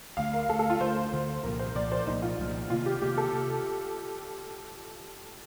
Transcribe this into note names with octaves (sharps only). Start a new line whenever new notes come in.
D2 D3 A3 F5
A#4
D2 D3 A3 A4
A4
F4
D2 D3 A3 C5
D2 D3 A3
C2 A#2 F3 A#3 A#4
C5
C2 A#2 F3 A#3 D5
C5
C2 A#2 F3 A#3 D#4
F4
C2 A#2 F3 A#3
C3 D#3 A#3 F4
G4
C3 D#3 A#3 G4
A4
C3